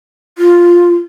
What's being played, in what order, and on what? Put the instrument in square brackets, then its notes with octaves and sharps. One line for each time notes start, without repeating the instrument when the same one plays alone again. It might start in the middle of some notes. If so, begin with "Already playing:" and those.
[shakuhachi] F4